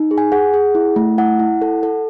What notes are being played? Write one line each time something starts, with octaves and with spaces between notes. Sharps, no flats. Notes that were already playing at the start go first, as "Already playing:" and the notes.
Already playing: D#4
G#4
G#5
G#4 F#5
G#4
E4
A3
E4 F#5
E4
A4
A4